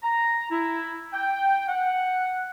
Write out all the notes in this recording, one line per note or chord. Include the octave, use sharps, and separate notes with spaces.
A#5
E4
G5
F#5